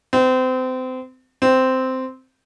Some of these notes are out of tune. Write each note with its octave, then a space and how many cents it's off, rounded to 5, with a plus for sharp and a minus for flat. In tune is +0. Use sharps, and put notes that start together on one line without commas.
C4 -30
C4 -10